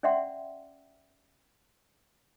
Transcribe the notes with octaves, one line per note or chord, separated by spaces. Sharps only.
C#4 D5 E5 F#5 G5 C6